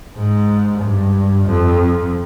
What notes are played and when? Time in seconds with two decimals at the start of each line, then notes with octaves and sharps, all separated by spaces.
0.16 G#2
0.81 G2
1.46 F2